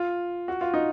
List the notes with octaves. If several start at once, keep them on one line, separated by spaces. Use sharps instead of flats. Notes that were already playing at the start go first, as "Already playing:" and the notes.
Already playing: F4
F#4
F4
D#4